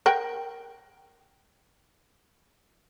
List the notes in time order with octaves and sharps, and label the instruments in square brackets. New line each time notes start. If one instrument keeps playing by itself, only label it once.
[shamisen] A#4 F#5 G5